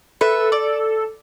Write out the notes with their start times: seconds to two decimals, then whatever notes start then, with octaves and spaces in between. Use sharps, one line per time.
0.21 A4 B4 E5
0.52 D5